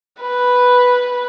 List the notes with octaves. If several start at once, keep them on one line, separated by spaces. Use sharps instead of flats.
B4